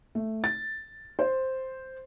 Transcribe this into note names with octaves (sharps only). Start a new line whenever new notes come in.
A3
A6
C5